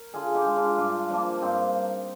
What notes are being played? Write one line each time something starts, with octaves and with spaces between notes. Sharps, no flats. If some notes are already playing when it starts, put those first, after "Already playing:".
Already playing: A#4
D3 F4 G#4
D#4 G4
G#3
D4 F4
G2 D4 F4
F3 A#3 D4
G2 C4 D#4